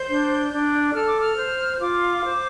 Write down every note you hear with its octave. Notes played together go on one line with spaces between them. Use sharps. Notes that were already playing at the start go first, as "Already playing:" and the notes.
Already playing: C5 G6
D4
D4
A4 F6
D6
F6
C5
F4 D6
C5